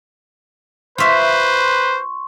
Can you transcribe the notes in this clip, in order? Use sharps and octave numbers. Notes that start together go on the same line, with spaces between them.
F4 B4 C5 E5 C6 C#6